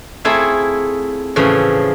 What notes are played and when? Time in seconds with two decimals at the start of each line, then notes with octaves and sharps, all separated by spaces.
0.25 A3 C4 E4 F4 G#4 A5
1.36 A2 C#3 E3 F3